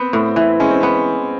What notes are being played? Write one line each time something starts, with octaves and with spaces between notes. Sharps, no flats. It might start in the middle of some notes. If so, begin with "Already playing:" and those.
Already playing: B3 C4
A2
E3
G#3 C#4
C4
B3 C#4